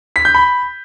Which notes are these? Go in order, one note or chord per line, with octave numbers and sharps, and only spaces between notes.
B6
G6
B5